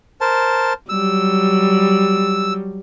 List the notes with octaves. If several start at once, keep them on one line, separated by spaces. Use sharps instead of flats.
A#4 C5 A5
F#3 G3 E6